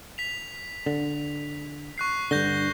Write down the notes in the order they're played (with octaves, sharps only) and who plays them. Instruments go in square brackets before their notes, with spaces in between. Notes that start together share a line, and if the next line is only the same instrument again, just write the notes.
[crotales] B6 F7
[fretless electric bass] D3
[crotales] C#6 F#6 C7
[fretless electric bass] G2 D3 [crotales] G6 A#6 G7